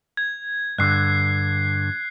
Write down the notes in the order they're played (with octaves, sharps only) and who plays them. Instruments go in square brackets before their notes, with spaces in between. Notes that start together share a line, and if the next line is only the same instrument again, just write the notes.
[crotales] G#6
[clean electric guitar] G2 D3 [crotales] F#6 C7